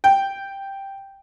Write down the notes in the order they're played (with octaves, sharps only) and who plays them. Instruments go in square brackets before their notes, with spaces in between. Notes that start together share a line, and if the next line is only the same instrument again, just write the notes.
[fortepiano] G5